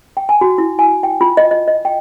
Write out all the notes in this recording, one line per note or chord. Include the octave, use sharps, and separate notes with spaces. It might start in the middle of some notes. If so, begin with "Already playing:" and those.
G5
G#5
F#4
E4
G#5
G5
F4
D#5
D#5
D#5
G5